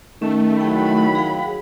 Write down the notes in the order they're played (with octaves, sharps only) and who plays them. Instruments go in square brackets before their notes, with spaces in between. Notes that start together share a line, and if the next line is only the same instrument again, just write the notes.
[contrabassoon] D#3 [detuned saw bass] A3 [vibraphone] C#4
[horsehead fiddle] F#3 B5 [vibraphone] E4 G#4 G5
[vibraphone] G#4 F5 G5